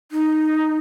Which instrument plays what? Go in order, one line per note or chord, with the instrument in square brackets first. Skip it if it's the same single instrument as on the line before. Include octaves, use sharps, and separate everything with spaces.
[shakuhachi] D#4